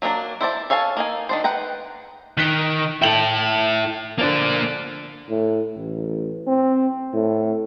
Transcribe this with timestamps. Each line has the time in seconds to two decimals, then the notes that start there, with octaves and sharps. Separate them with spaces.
0.02 F#3 A#3 B3 D4 A#4
0.41 E4 C5 D5 A5
0.70 A4 C#5 F5 G#5 A5
0.97 A#3 D#4 G#5
1.29 D#3 D4 C5
1.44 B4 F#5 G5 A#5
2.37 D#3 F#6 B6 G7
3.02 E4 A4 G5 F#7
4.19 D3 F3 A#3 D5
5.30 A2
5.78 A1
6.47 C4
7.14 A2